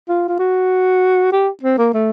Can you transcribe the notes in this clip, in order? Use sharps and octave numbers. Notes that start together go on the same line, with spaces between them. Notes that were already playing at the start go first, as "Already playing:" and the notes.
F4
F4
F#4
G4
C4
A#3
A3